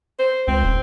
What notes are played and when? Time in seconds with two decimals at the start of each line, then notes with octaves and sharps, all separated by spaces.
0.19 C5
0.48 C#2 C4
0.64 D#1